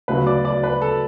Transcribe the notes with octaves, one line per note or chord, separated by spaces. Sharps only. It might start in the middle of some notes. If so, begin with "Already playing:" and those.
D2 C#3 F#3 B3 B4
D5
D5
B4
A4